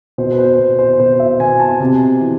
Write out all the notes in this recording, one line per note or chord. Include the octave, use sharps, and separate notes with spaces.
B2 C5
B4
C5
B2
C5
B2 C5
E5
B2 G#5
A5
C3 G#5
E3